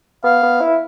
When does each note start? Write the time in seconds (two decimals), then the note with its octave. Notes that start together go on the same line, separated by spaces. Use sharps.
0.24 B3 F5
0.43 B3
0.61 E4